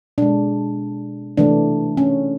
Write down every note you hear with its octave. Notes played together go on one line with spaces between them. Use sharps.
B2 G#3 D4
C3 E3 A3 D4
C#4